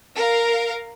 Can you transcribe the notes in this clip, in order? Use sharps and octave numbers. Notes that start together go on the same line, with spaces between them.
A#4 F5